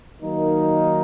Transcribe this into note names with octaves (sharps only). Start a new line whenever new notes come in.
D#3 F#3 A#3 D#4